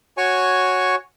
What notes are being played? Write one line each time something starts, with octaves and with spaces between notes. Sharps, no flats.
F#4 C#5 G#5 C#6